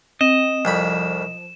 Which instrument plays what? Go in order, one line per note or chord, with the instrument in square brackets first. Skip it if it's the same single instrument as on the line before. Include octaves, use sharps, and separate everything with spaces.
[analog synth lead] C4 [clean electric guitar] D#5 [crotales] E7
[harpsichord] C2 F2 B5 [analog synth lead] F3